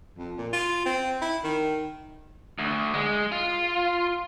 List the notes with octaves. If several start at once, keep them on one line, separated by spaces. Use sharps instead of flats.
F2
A#2
F4
C4
E4
D#3
D2
G#3
F4